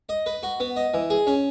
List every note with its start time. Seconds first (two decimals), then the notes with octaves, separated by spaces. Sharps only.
0.09 D#5
0.26 B4
0.43 F#4
0.60 B3
0.76 D#5
0.94 E3
1.10 G#4
1.27 C#4